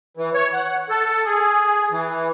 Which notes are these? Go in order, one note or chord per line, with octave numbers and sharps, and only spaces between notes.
E3
C#5
F#5
A4
G#4
E3